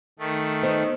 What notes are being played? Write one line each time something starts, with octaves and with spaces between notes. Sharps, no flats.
D#3 A3
B3 D#4 C5